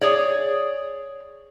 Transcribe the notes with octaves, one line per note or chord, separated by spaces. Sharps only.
G#4 C#5 D5